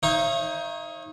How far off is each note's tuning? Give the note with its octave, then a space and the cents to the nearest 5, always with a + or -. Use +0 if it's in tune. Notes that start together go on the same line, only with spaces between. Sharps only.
D#4 +15 C#5 -30 E5 +45